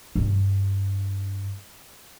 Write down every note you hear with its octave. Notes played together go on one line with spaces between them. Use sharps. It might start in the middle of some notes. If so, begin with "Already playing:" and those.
G2 G3